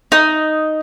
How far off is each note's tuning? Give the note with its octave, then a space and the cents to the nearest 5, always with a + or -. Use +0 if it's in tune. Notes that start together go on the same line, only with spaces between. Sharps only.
D#4 +0 D#6 +5